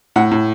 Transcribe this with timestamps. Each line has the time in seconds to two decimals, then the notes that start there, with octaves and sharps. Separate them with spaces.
0.16 A2 F#5
0.31 A2